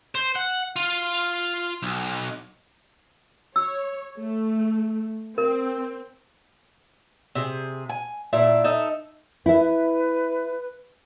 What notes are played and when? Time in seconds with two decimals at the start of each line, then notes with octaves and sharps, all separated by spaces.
0.15 C5
0.36 F#5
0.76 F4
1.83 B1
3.56 C#5 E6
4.20 A3
5.38 C4 A#4
7.35 C3 G#4
7.89 G#5
8.33 A#2 D4 E4 E5
8.64 D#4 A4 E5
9.46 E4 B4 E5